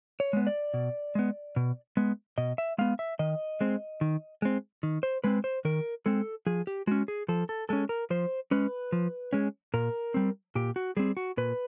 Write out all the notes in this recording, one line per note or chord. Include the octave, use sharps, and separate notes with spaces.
C#5
G#3 B3
D5
B2
G#3 B3
B2
G#3 B3
B2 D#5
E5
G#3 B3 F5
E5
D#3 D#5
G#3 C4
D#3
G#3 C4
D#3
C5
G#3 C4 B4
C5
D#3 A#4
G#3 C4 A4
F3 G#4
G4
G#3 C#4 F#4
G#4
F3 A4
A4
G#3 C#4 A4
A#4
F3 C5
G#3 C#4 B4
F3
G#3 C#4
A#2 A#4
G3 C4
A#2 G4
F#4
G3 C4 G#4
F#4
A#2 B4